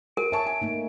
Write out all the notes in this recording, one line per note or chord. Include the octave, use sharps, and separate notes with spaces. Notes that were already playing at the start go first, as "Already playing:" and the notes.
A#4 D7
C#5 E5 G#5 A5 C#6
G#5
A3 A#3 D#4